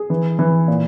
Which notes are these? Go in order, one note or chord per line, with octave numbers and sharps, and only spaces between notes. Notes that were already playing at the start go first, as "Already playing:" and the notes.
Already playing: G#4
E3
E3
A#2